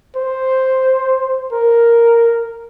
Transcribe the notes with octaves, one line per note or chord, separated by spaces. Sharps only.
C5
A#4